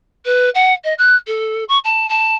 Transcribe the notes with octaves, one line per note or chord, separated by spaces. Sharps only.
B4
F#5
D#5
F#6
A4
C#6
A5
A5